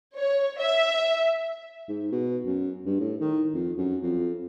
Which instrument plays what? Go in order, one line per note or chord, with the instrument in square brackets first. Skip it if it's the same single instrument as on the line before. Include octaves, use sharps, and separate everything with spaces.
[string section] C#5
E5
[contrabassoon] G#2
B2
F#2
G2
A2
D#3
F2
F#2
F2